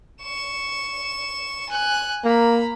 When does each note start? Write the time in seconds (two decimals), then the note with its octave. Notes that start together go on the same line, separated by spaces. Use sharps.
0.23 C#6 E7
1.69 G#5 F#6
2.24 A#3 A#5 B5